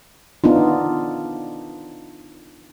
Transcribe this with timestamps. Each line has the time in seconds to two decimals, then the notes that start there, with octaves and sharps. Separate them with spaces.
0.44 B3 D4 D#4 F4